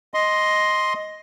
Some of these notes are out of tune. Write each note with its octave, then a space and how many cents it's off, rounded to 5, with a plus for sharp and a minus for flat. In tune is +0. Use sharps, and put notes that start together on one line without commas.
D#5 +5 C6 +0